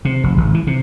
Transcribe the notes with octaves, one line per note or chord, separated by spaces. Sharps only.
C3
F1
G#1
E3
C3